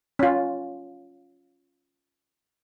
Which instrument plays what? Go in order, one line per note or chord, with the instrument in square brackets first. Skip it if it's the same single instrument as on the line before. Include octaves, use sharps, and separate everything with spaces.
[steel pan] C#4 F4